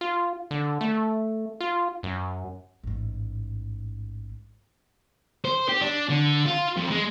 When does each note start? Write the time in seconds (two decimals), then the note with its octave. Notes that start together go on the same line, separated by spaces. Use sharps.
0.01 F4
0.51 D3
0.81 A3
1.60 F4
2.03 F#2
2.84 A1 G#2
5.45 C5
5.69 G4
5.82 D4
6.09 D3
6.45 F4
6.76 F2
6.91 G#3